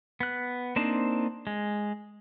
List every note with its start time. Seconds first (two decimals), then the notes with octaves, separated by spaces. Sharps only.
0.20 B3 F#6
0.76 A#3 C4 D4 D#4 C5
1.47 G#3